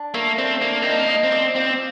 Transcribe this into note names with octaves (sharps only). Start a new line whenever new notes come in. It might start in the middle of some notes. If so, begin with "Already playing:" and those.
Already playing: D4
A3 A#3
C4 D4
A#3 D5
C4 D#4
A#3
D#4
C4
D5
C4 F4